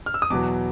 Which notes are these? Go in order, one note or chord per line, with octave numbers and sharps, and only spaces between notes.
F6
E6
D#6
E2 B2 F#3 B3 D6